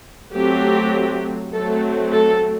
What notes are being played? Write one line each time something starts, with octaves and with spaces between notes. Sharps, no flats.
F#3 A3 C4 G4
F#3 A3 C4 A4
A4